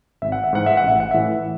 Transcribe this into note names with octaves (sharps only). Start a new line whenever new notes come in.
G#1 E5
F#5
E5
G#2 E3 F#5
E5
F#5
A1 E5
F#5
A2 E3 E5